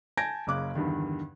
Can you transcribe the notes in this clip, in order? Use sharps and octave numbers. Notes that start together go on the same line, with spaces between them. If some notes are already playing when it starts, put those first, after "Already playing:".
G#5 A5 G6 G#6 A#6 D7
F#1 C#3 D6 F#6
E2 G2 D3 D#3